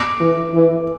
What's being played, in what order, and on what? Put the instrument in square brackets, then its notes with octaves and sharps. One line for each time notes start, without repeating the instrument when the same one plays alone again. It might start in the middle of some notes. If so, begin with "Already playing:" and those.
Already playing: [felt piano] D6
[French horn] E3
E3